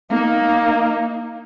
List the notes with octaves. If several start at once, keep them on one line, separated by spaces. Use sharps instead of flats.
A#3 D#4